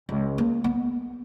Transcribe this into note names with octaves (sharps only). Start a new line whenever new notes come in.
C#2
A#3
B3